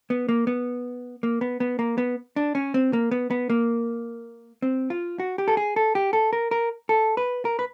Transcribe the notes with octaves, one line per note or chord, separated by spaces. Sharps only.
B3
A#3
B3
A#3
B3
B3
A#3
B3
D4
C#4
C4
A#3
B3
B3
A#3
C4
F4
F#4
G4
A4
G#4
A4
G4
A4
A#4
A#4
A4
B4
A#4
B4